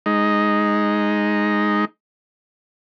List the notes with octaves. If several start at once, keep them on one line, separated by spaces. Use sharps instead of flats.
G#3 D#4